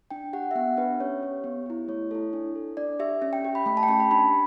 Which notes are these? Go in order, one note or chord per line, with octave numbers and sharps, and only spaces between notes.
D4 G5
G4 F#5
E5
B3 F#5
D4 G4 B4
C#4 C#5
G4
B3
E4 G4
A3 C#5
E4 A4
D4
A4
D4 D5
G4 E5
C#4 E5
G5
G4
B5
A3 B5
A5
G5
C#4 G4 A5
B5
D4 B5